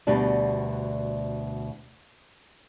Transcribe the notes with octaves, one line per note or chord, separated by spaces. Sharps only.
D2 B2 G3 D4